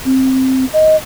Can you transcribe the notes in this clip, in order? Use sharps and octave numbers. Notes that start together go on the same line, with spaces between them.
C4
D#5